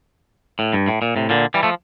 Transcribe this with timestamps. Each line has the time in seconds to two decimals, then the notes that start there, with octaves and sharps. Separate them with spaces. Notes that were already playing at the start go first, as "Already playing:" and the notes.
0.59 A2
0.73 G2
0.88 A2
1.02 A#2
1.16 A2 C3
1.30 A#2 D3
1.54 E3 G3
1.63 F3 A3